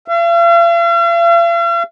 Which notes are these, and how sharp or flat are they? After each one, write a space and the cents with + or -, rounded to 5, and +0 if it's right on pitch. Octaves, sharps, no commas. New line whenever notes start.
F5 -45